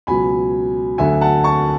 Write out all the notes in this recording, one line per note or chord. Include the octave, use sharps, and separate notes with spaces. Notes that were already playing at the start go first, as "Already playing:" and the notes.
C#2 B2 F#3 G#5 B5
D2 D3 F#3 E5 G#5
F#5 A5
A5 C#6